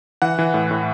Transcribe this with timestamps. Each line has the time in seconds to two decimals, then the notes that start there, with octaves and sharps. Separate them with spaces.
0.22 E3 F#5
0.39 E3
0.54 A2
0.71 A2